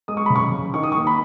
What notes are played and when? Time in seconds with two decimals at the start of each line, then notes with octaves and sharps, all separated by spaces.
0.08 G#3 D#6
0.17 C#6
0.26 B5
0.30 C#3
0.36 C#6
0.52 C#3
0.74 D#3 C#6
0.83 D#6
0.92 C#6
0.96 A#3
1.07 B5